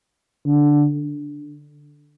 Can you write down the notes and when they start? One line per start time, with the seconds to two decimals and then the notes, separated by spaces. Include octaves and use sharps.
0.46 D3